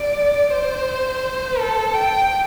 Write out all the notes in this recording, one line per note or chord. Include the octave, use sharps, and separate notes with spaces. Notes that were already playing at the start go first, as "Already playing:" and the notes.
Already playing: D5
C5
A4
G5